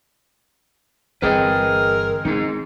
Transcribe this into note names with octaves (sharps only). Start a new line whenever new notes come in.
G1 E3 C4 G#4 A#4 B4 D#5 G5
D#3 C4 C#4 D#4 G#4